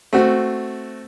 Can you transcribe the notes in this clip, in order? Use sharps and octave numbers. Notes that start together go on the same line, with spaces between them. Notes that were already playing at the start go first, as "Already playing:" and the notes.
A3 C4 F#4